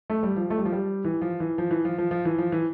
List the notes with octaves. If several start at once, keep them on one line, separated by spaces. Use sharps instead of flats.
A3
G3
F3
A3
G3
F3
G3
E3
F3
E3
F3
E3
F3
F3
F3
E3
F3
E3